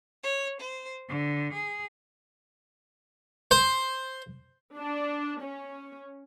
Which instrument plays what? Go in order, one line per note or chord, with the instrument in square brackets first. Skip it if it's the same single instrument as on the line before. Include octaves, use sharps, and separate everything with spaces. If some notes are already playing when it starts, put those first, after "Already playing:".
[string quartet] C#5
C5
D3
G#4
[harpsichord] C5
[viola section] D4
C#4